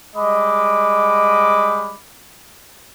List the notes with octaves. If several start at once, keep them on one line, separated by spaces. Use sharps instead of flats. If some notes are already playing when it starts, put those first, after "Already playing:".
G3 G#3 D#5 B5 D6